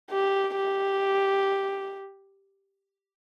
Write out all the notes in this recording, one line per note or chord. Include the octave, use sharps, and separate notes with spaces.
G4
G4